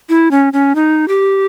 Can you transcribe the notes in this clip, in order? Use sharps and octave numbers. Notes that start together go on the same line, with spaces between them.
E4
C#4
C#4
D#4
G4